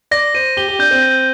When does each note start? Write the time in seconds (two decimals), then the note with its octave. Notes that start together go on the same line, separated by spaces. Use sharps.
0.11 D5 A#6
0.34 C5 D#7
0.57 G4 G7
0.68 G4
0.79 D4 G6
0.91 C4
1.03 A#6